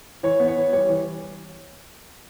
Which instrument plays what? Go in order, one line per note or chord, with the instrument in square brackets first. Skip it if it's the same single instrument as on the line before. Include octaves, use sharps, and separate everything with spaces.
[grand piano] E3 C#5
B3
C#5
E3
G3 C#5
E3